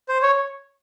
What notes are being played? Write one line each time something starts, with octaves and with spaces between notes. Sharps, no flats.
C5
C#5